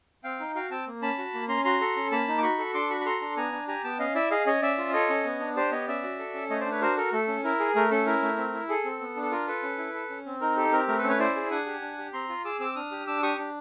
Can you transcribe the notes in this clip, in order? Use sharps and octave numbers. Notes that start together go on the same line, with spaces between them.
C4 F5 G5
D#4
F#4 F5 G5
C4 G5 A5
A#3
C#4 A5 B5
F#4
A#3
C#4 A#5 C6
F#4 A#5 C6
A4
C#4
A#3 A5 B5
D#4
D6
F#4 B5 C#6
A4
D4 C6 D6
F#4 B5 C#6
B5
A4 A#5 C6
D4
B3 G#5 A#5
D4
G4 G#5 A#5
B3 G5 A5
C#4 D#5 F5
E4 D5 E5
G#4 D#5 F5
C#4 C#5 D#5
C#4 D5 E5
F4
A4 C#5 D#5
C#4
B3
D4
G4 C5 D5
B3 C#5 D#5
C#4 D5 E5
F#4
A4
C#4
A3 C#5 D#5
C5 D5
D4
B4 C#5
F#4 A#4 C5
A4 A#4
A3 A4
C#4
E4 A#4
G#4
A3 A#4
C#4 A4
E4 A#4
A3
C4
E4
G#4 A4
C4
B3
D4
A4
F4 A#4
A4 B4
C#4
E4
A4
C#4
C4
D#4 A#4
G4 A4
C4 A#4
A3 A#4
A4 B4
C#4
B4 C#5
E4 C5 D5
G#4
D4 F#5 G#5
G4
D4
G4
C4 A#5 C6
F4
G#4 D6 E6
C4 D6 E6
D4 D#6 F6
G4
D4 D6 E6
G4 C#6 D#6
D4